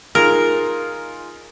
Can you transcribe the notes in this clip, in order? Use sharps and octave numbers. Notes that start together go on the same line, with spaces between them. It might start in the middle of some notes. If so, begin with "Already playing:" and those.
D#4 F4 G#4 A#4